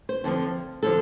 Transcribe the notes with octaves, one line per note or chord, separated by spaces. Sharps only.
C5
F2 D3 F3
D3 F3 A4